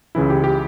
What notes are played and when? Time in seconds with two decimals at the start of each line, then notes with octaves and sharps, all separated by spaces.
0.15 C#2 C#3 E3 E4
0.30 G4
0.44 G4